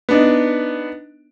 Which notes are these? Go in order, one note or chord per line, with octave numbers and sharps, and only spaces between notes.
B3 D4 D#4